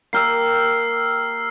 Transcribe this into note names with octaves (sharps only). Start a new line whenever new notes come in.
A#3 G4 E6 F6 C7